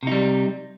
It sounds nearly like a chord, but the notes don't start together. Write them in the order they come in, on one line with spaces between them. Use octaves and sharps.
C3 D#4 G3